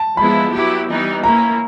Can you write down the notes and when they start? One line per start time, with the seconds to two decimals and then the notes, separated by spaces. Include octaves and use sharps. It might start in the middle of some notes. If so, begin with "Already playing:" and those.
Already playing: A5
0.17 F3 G#3 B3 E4 B5
0.53 F#3 B3 E4 G4
0.89 E3 G3 B3 D#4
1.24 A#3 C#4 E4 A#5